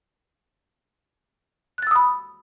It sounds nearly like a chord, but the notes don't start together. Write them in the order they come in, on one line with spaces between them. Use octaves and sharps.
F#6 A6 E6 D#6 B5